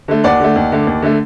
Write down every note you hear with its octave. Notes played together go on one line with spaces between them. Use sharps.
D3 A3
D#2 D5 F#5
D3 A3
D#2
D3 A3
D#2
D3 A3